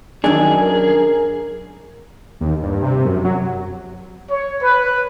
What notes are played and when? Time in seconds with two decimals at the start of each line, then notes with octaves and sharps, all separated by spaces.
0.24 F#2 D#3 D4 G#4
0.62 A#4
2.41 D#2
2.63 G2
2.82 C3
3.05 F#2
3.24 F#3
4.31 C#5
4.62 B4